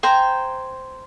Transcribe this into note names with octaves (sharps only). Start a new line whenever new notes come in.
C5 G5 G#5 A#5